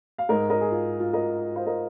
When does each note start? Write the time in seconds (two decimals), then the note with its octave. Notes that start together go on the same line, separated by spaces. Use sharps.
0.18 F5
0.29 G#2 G#3 A#4 D#5
0.50 A#4 D#5
0.61 G#4
0.71 F4
1.00 F4
1.13 A#4 D#5
1.56 C5 F5
1.66 A#4 D#5